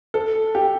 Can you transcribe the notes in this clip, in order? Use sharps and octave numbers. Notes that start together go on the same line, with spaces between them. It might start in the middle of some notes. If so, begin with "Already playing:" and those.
A4
G4